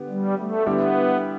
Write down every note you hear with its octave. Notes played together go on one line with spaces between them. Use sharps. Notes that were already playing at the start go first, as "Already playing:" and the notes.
Already playing: D3 B3 G4
G3
A3
D3 G3 B3 E4 G4